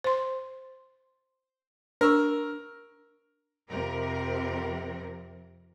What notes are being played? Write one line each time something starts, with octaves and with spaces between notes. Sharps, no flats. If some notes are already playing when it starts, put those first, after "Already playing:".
C5 C6
D4 A#4 C#6 E6
F2 C3 A#4